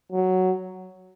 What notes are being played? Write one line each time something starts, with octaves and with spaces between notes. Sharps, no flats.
F#3